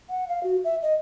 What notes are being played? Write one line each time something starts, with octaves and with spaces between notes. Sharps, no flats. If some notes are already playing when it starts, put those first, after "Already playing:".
F#5
F5
F#4
E5
D#5